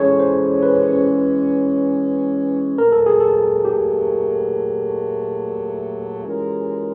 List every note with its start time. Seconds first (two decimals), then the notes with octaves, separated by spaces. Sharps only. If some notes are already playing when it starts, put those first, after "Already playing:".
Already playing: E3 G#3 C#4 G#4 A4 C#5
0.20 C5
0.63 B4
2.78 A#2 F#3 A3 A#4
2.92 A4
3.06 G#4
3.20 A4
3.65 G4
6.24 E3 G#3 C#4 F4 A#4